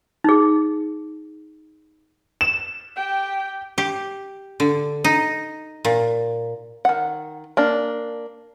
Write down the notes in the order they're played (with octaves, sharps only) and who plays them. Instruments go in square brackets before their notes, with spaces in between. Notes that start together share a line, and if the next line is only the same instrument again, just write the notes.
[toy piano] D#4 G#4
[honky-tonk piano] E7
[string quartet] G4 G5
[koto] G4
D3
D#4
A#2
[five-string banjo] D#3 F#5
A#3 D4